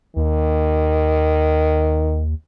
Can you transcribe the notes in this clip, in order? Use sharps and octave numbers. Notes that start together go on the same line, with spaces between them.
D#2 D#3